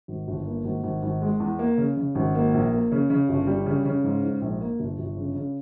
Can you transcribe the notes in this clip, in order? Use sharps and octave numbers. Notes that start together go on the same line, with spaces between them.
G#1
G1
A#3
G#1
G#1
G#1
G#3
E2
A#3
C#3
C#3
G#1
A#3
A#1
A#3
C#3
C#3
G1
G3
C#3
C#3
G#2
G#2
A#1
A#3
G1
G1
C#3
C#3